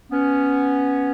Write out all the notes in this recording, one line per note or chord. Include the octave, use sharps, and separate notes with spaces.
B3 C#4